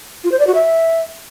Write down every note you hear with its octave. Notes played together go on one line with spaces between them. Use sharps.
F4
C5
D5
F#4
E5